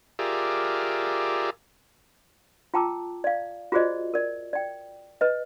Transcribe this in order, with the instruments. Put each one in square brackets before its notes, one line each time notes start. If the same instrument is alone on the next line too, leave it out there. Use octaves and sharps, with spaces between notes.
[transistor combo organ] F4 G4 G#4 A#4 D5 E5
[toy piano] F4 G5 A5 A#5 D6 E6
D5 F5
F4 F#4 G#4 C5 D5 D#5
A#4 D5
D5 G5
B4 D#5